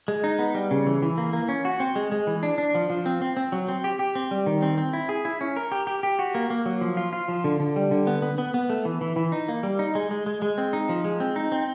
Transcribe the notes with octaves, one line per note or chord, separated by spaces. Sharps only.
G#3
D#4
B3
G3
C#3
E3
E3
A#3
A#3
C#4
F#4
C4
G#3
G#3
E3
D4
D4
F3
F3
C4
C4
C4
F#3
C4
G4
G4
C4
G3
D#3
C4
C4
E4
G#4
E4
C#4
A#4
G4
G4
G4
F#4
A#3
A#3
F#3
F3
F4
F4
F3
D3
D3
G3
D3
B3
B3
B3
B3
A3
E3
E3
E3
D#4
A#3
G3
D#4
G#3
G#3
G#3
G#3
C4
D#4
F3
G#3
C4
D#4
C4